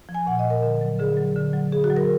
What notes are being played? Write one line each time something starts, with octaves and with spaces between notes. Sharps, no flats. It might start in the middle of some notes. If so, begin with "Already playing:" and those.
F3
G#5
A#2 F#5
D#5
F3
A#4
D3
F#3
D3 G#4
F#3
D3
F#3
D3 G#4
F#4
F#3
A#4